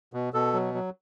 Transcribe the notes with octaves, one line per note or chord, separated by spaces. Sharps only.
B2
B2 A4
F#3
F#3